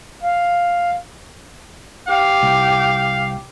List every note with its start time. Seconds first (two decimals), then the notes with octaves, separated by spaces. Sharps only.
0.23 F5
2.08 G4 F5
2.43 C2